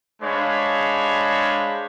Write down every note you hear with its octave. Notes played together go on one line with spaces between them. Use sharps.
G#3 D4 C5 C#5 F5 B5